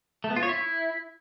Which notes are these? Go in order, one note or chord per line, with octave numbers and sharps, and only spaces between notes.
A3
B3
F4
C#5
E4